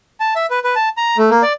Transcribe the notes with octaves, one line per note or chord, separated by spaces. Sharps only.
A5
E5
B4
B4
A5
A#5
A3
A#3
D5